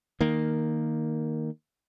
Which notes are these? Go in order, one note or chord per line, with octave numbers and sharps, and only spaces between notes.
D#3 A#3